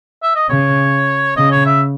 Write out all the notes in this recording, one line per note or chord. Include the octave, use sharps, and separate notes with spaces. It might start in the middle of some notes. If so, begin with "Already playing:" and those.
E5
D#5
C#3 C#5
C#3 D#5
C#5
E5